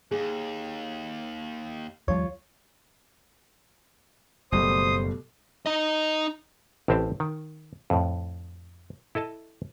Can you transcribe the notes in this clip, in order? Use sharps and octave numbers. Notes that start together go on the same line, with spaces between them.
D#2 G#4
D#2 F3 G3 F4 C#5
F#1 B2 G3 A3 C5 D#6
D#4 D#5
A1 A2 C4 G4 C5 A5
D#3
F2 A2
E4 A4 D#5 A5